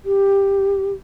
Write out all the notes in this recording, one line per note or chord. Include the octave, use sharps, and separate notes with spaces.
G4